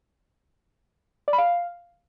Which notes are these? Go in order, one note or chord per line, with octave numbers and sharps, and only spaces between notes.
D5
B5
F5